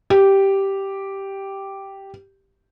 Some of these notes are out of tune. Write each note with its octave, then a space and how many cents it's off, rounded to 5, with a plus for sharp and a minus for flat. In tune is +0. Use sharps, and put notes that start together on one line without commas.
G4 -5